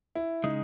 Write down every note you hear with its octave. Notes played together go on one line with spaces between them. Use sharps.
E4
C#3 G#3 D#4